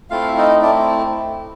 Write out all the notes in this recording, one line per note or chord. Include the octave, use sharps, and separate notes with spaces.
A3 C4 E4 F4 F5
E5
D#4 D#5
A3 C4 D4 E4 D5